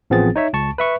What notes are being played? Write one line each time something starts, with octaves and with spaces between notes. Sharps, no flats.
A1 F3 B3 C4 G#4 A6
D#4 C#5 E5
C#2 A5 C#6
B4 E5 C#6